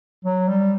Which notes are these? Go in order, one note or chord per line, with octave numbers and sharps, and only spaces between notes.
F#3
G3